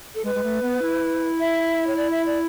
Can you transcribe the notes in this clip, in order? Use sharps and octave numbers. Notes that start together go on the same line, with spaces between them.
A4
G#3 B4
G#3
A3
B3
E4
E5
C#5
D5
E5
D5